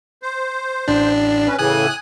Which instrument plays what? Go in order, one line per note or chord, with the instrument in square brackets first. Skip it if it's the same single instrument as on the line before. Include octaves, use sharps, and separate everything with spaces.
[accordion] C5
[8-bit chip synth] A1 D4
[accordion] C#4 B4
[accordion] A2 C#3 E3 [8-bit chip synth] G#5 D#6 F#6